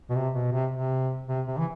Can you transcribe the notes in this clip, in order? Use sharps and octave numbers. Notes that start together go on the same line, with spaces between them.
B2
C3
B2
C3
C3
C3
C3
E3